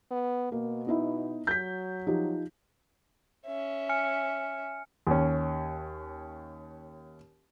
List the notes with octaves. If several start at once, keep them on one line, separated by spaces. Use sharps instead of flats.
B3
B2 A#3
B3 D#4 E4
F#3 G6 B6
F3 D#4 G4
C#4 E5
G#5 F6 C#7
D#2 C#4